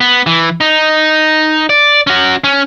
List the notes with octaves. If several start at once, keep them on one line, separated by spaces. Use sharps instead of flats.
B3
E3
D#4
D5
C#4 F#4
C#4